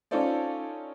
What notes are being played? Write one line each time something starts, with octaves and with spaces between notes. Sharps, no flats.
C#4 D#4 F4 A4 C5 D5